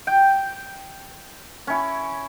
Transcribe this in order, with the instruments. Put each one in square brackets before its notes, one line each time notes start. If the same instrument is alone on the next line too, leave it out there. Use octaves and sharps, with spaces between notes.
[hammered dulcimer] G5
C#4 E4